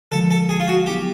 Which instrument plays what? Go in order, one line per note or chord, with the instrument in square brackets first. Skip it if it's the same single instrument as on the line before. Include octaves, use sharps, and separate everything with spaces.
[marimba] D3 F3 G#3 [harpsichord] A4
[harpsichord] A4
G#4
F4
F#4
[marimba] F#3 B3 E4 [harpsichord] G4